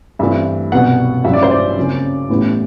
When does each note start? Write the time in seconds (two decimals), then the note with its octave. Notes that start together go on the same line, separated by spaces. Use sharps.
0.19 G2 E3 A3 C4 E5
0.72 C2 B2 F#3 B3 F#5
1.24 A1 G2 F#3 E5
1.33 D5
1.43 C5
1.51 D5
1.77 F#1 F#2 F#3 C4
2.29 A1 A2 G3 B3